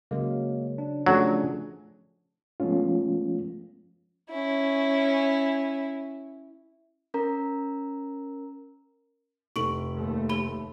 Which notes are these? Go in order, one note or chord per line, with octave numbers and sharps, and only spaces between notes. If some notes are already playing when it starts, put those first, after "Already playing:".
C#3 F#3 G#3 A#3
D4
F3 F#3 A3 C#4 D4 G#4 A4 G#5
F3 G#3 A3 B3 C#4 F4
C#4 E4
C#4 A#4 A#5
F1 C#6 D7 F#7
D#2 A3
G4 B5 G7